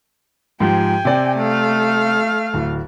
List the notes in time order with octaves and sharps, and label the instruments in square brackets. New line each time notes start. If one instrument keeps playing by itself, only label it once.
[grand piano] G#2 F3 G4 [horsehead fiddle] G5 G#5
[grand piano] C3 C4 D5
[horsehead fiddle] A3 F5
[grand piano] D1